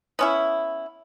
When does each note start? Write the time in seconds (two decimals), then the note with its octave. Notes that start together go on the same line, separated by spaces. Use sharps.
0.19 B3 C#4 E4